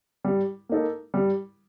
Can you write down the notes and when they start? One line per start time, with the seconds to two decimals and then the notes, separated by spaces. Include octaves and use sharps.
0.24 G3
0.69 A#3 D#4 A4
1.14 G3